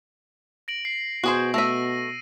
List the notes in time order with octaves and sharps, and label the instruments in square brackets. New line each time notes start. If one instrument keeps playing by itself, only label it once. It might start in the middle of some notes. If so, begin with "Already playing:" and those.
[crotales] A#6 D7 F#7
C7
[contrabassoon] B2 [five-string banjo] F#4 G#4 C5
[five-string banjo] A3 E5 [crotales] E6 A#6 D#7